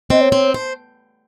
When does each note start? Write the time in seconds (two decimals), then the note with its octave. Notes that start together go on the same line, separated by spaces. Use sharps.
0.10 C4 D#5
0.21 C#5
0.32 C4
0.54 C5